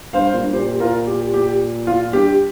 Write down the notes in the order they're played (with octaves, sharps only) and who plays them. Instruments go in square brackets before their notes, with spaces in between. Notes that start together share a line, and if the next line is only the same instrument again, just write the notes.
[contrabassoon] G2 [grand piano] C5 F5
[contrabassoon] A#2
G2
[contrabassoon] A#2 [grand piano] G4 C5
[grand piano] F4 A#4
G4
G4
F4
[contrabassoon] G2 [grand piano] G4